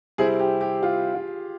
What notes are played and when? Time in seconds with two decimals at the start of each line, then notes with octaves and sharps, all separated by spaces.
0.18 C3 G3 C4 E4 G#4
0.39 G4
0.61 G4
0.83 F4
1.15 F4